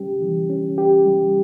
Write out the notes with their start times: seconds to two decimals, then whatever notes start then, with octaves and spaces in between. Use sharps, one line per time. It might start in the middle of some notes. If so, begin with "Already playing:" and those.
Already playing: G3 C#4 G4
0.22 E3
0.50 C#4
0.78 G4
1.06 G3